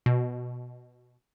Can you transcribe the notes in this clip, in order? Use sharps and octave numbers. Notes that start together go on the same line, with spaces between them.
B2